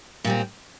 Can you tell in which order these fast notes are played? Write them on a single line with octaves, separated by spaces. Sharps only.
A#2 G3 C4